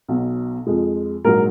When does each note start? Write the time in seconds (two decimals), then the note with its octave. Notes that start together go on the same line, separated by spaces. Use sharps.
0.08 B1 B2 F#3
0.67 F2 F3 G#3
1.25 A#1 G#2 F#3 A#4